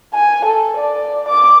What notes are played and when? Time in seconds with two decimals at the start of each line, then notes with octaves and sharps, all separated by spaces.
0.14 G#5
0.45 A4
0.77 D5
1.29 D6